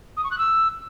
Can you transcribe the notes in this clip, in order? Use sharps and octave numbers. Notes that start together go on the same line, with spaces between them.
D#6
C#6
F#6
E6